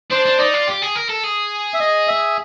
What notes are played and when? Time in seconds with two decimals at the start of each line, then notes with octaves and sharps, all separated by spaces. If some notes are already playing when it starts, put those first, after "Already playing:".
0.11 D4 C5
0.26 D4
0.39 D#4 D5
0.54 F4
0.67 G4
0.82 G#4
0.95 A#4
1.09 A4
1.24 G#4
1.74 E5
1.80 D#5
2.08 E5